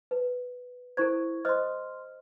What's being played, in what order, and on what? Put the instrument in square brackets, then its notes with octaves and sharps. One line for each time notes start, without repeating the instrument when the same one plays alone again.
[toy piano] B4
[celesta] E4 C#6 G#6 [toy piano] A4 A#4 C5
[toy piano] C5 D#5 D#6 [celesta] C6 F6